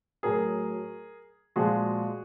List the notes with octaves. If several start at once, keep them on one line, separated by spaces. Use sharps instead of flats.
A2 F#3 G#4 A#4
A#2 F3 G#3 F#4 G#4